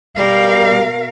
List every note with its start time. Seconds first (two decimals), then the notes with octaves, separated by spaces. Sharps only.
0.18 B2 G3 A#4 F5